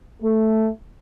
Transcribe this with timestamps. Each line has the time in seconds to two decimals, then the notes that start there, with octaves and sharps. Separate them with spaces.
0.22 A3